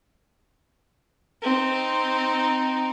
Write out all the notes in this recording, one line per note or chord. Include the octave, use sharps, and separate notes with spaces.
C4 D#4